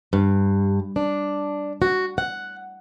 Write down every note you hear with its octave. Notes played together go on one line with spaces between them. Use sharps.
G2
D4
F#4
F#5